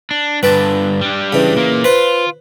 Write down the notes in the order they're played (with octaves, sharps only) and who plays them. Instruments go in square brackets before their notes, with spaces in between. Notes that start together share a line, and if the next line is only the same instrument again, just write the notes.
[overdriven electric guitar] D4
[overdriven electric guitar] G2 D3 [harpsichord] B4 G5 A5
[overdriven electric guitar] G3 D4
[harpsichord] C#3 E3
[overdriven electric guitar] A#2 A#3
[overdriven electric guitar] F4 [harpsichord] B4 C5